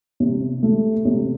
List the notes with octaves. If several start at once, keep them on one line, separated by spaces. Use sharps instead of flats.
C3
A3
C3